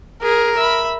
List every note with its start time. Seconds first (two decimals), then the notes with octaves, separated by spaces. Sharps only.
0.22 G#4 A#4
0.57 E5 B5